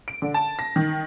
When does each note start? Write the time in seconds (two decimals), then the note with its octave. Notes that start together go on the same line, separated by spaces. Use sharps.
0.08 D7
0.22 D3
0.34 A5
0.59 A#6
0.76 D#3